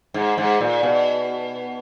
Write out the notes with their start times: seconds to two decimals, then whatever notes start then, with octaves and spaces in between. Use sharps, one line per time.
0.14 G#2
0.38 G#2
0.61 A#2
0.83 B2